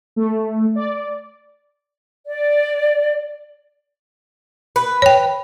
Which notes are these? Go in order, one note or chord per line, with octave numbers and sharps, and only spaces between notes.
A3
D5
D5
B4
C#5 G5